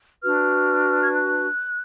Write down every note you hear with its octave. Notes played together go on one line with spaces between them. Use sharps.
D4 F#4 B4 F6
G#6
F#6